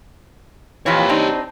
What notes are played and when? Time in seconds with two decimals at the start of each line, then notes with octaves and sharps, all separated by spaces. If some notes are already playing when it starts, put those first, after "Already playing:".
0.86 F2 A#2 E3 G4 C#5
1.09 C4 D4 D#4